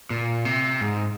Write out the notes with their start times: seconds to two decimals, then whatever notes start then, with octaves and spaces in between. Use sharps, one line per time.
0.10 A#2
0.45 C3
0.81 G#2